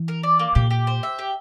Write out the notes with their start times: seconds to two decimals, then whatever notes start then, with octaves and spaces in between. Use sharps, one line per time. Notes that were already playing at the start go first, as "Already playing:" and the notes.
Already playing: E3
0.08 A#4
0.23 D5
0.39 A#3
0.55 A#2 G4
0.71 G4
0.87 C5
1.03 E5
1.19 G4